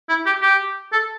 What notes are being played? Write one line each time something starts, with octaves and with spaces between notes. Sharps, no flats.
E4
G4
G4
A4